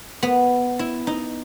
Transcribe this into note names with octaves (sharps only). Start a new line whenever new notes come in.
B3
E4
D#4